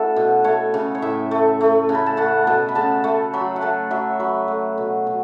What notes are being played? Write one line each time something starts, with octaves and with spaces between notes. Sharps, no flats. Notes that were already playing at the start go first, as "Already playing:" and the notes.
Already playing: A3 C#4 E4 F#4 A4
B2
A3 C#5
C#3
C#5
A2 E5
A3
A3
C#3
B5
A5
A3 F#5
B2 A5
B5
C#3 A5
A3
F#3 B5
F#5
A3 A5
F#3 E5
F#3 B4
A3
B2
B2